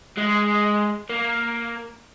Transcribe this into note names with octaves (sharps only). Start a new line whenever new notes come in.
G#3
A#3